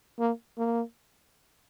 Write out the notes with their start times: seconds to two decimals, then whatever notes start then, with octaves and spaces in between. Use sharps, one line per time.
0.19 A#3
0.58 A#3